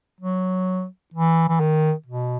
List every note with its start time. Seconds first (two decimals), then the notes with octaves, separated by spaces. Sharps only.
0.20 F#3
1.14 E3
1.49 E3
1.60 D#3
2.06 B2